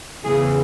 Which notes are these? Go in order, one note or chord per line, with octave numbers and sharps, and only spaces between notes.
E2 C#3 E3 G#4